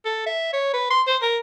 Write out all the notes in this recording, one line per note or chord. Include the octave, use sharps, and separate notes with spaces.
A4
E5
C#5
B4
C6
C5
A#4